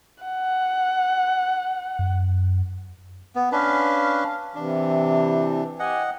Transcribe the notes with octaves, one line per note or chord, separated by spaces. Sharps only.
F#5
F#2
B3
C#4 D4 B4 F5
C3 E3 D4
G4 D#5 F#5 G#5